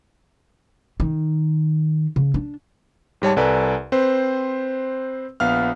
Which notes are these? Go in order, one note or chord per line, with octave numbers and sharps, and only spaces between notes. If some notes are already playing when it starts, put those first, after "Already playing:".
D#3
C#3
D4
G#2 G3 C#5 A5
C2 A4 B4 D5 G#5 A#5
C4 B4 C5
A#1 B3 F5 F6